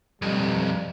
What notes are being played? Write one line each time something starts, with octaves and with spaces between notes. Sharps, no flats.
B1 F2 G3